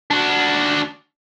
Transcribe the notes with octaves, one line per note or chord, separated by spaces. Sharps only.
D4 F#4